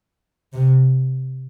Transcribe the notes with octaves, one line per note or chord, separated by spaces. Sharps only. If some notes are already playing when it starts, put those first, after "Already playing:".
C3